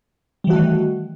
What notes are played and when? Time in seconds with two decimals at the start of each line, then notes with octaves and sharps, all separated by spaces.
0.44 G3
0.47 E3
0.50 F#4
0.53 A3
0.56 D#3